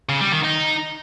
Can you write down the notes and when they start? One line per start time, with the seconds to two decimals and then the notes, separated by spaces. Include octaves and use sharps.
0.09 C#3
0.21 G3
0.32 D#3
0.44 D#4